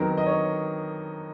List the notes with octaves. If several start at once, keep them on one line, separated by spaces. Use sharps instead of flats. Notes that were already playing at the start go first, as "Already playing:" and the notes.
Already playing: F2 D#3 F#3 B3 A#4
D#5
C#5